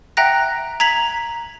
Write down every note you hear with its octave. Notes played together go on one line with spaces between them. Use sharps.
E5 F#5 G5 A#5 F#6 A#6
A#5 G#6 B6 F7 F#7